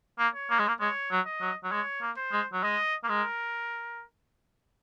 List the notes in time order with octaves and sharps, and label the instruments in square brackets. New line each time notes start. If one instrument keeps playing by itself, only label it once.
[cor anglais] A#3
[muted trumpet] C#5
[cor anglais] A#3
G#3
A#3
[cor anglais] G#3 [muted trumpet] C#5
[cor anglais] F#3
[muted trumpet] D#5
[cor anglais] F#3
F#3
[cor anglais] G#3 [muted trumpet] C#5
[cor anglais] A#3
[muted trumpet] C5
[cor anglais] G#3
F#3
[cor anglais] G#3 [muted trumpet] D#5
[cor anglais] A#3
[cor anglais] G#3 [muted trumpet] A#4